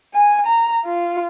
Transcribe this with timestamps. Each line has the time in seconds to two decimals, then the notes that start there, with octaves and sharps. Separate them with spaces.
0.14 G#5
0.47 A#5
0.85 F4